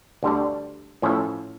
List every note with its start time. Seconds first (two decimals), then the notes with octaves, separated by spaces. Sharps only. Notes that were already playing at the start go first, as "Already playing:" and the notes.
0.23 D2 D3 G3 D4
1.02 A2 F3 C#4 E4 A4